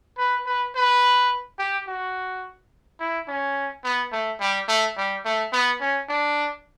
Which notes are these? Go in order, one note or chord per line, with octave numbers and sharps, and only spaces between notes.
B4
B4
B4
G4
F#4
E4
C#4
B3
A3
G3
A3
G3
A3
B3
C#4
D4